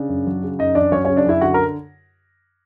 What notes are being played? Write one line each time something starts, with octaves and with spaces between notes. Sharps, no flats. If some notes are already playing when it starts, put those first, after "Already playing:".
Already playing: C#3 D4
F#2
F#3
C#3
F#2 D#4 D#5
F#2 D4 D5
F#3 C#4 C#5
C#3 C#4 C#5
D4 D5
F#2 E4 E5
D3 F#4 F#5
A#4 A#5